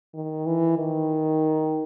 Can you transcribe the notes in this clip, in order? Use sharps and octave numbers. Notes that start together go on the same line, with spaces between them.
D#3
E3
D#3